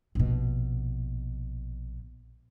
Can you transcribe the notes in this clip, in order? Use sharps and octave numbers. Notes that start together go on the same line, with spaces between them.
A#1 B2